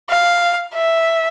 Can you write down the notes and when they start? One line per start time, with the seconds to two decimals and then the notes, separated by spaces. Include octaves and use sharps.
0.09 F5
0.74 E5